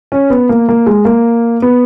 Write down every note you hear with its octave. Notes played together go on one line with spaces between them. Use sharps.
C#4
B3
A#3
A#3
G#3
A#3
B3